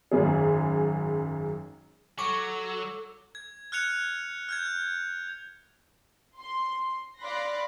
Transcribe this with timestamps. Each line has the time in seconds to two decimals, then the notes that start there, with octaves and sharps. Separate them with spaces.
0.11 G#1 F#2 G#4
2.19 F#3 A4 C#6 D6
3.35 G#6
3.72 F6 F#6 G#6 C#7 F7
4.49 F6 G6 G#6
6.38 C6
7.20 D5 F5 B5 C6 F#6 A#6